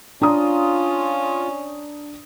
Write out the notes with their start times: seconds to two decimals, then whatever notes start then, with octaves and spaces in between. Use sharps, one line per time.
0.21 C#4 D4 F4 A#5 D#6